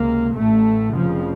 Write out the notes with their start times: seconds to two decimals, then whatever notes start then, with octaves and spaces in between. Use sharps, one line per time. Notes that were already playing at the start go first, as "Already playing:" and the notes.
Already playing: C#2 C3 A#3
0.35 A1 A2 A3
0.94 F1 F2 C#3 F3